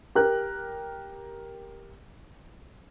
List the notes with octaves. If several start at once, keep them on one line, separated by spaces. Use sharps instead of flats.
G4 A#4 F#6